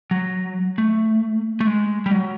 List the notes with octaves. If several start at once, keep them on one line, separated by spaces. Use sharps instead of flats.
F#3
A3
A3
G#3
G3
F#3